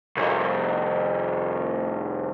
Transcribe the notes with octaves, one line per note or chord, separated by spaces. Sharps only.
C2 F2